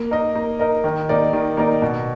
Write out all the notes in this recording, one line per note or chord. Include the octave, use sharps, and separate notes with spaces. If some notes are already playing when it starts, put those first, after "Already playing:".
Already playing: A#3
D#4 A#4 D#5
A#3
D#4 A#4 D#5
D#3
A#3 D#4 A#4 D5
D#3
A#3 D#4 A#4 D5
B2